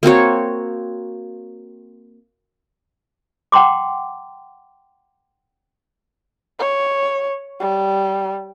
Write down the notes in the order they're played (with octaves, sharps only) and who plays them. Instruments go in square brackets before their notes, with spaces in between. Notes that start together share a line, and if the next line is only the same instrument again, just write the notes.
[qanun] A#3 C4 F#4 C#5
[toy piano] F#5 G5 A#5 C6 D6
[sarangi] C#5
G3